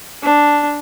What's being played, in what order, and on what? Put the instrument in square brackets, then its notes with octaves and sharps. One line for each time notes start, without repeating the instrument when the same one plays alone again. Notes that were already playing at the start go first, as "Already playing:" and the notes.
[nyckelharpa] D4